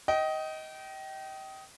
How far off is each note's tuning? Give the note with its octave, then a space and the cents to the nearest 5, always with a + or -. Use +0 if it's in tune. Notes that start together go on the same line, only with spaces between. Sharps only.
D#5 +15 G5 -25